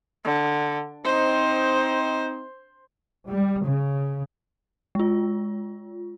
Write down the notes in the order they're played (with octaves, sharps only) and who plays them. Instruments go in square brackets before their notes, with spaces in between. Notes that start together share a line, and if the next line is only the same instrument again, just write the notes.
[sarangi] D3
[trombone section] C4 D#4 [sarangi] C5
[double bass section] G3
C#3
[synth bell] G#3 F4